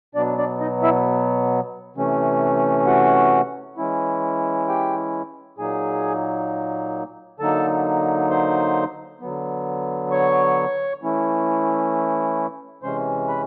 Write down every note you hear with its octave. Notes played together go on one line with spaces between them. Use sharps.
B2 F#3 B3 D4 D5
D4 D5
D#4 D#5
E4 E5
C3 E3 A3 C#4
F#4 F#5
E3 G#3 C#4 E4
G4 G5
A#2 F#3 A#3 D#4 G#4 G#5
D3 F#3 A#3 D#4 A4 A5
C5 C6
D3 F#3 B3
C#5 C#6
E3 A3 C#4 E4
C3 E3 G#3 C#4 C5 C6
B4 B5